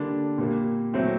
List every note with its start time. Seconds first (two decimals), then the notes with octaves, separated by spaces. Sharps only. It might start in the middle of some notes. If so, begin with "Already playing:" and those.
Already playing: D3 G3 A#3 D4
0.38 A#2 G3 A#3
0.93 A#2 F#3 A3 C4 E4